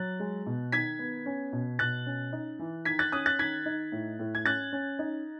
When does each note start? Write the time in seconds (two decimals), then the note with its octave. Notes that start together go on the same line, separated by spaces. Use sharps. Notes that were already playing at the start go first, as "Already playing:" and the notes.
Already playing: F#3 F#6 A6
0.20 G#3
0.46 B2
0.72 D#3 G#6 B6
0.99 B3
1.26 C#4
1.53 B2
1.79 B2 F#6 A6
2.06 C#4
2.33 D#4
2.59 E3
2.85 D#3 G#6 B6
2.99 F#6 A6
3.12 C#4 D#6 F#6
3.26 F#6 A6
3.39 D#3 G#6 B6
3.66 D#4
3.92 A2
4.19 A2
4.35 G#6
4.46 C#4 F#6 A6
4.73 C#4
4.99 D#4